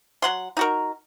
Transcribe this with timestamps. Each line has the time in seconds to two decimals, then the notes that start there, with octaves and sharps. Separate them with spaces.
0.22 F#3 F#5 C6
0.57 D#4 F#4 A#4